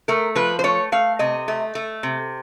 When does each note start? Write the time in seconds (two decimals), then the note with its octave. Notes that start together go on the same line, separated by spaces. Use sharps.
0.08 A3 A#4
0.35 F3 B4
0.59 C5
0.64 A3 C#5
0.92 A3 F5
1.19 C3 D#5
1.48 A3
1.75 A3
2.03 C3